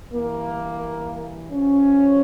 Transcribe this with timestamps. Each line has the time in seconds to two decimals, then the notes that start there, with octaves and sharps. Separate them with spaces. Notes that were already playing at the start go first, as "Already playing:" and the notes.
0.12 G2 E3 A#3
1.51 G2 F3 C#4